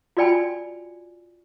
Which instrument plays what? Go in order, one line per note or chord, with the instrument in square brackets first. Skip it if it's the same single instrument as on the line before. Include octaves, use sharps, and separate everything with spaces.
[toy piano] F4 F#4 D5 G5 G#5 B5